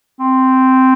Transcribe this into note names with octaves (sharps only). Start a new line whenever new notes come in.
C4